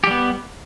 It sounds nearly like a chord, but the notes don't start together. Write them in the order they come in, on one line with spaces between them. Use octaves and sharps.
G4 G3 B3